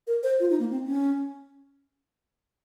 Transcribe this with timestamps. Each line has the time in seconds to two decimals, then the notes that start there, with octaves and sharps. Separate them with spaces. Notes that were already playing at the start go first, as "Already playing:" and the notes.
0.07 A#4
0.23 C5
0.40 F4
0.50 D#4
0.60 A#3
0.71 C4
0.86 C#4